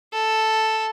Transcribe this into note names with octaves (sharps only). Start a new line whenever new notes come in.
A4